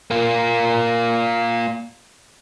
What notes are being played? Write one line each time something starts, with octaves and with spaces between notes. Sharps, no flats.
A#3 F4